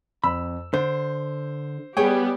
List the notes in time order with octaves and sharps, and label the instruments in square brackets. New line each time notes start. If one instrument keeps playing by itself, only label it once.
[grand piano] F2 E6 [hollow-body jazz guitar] B5
[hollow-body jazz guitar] D3 [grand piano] C5
[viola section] G3 B3 G4 [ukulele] G#4 C#5 [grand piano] G5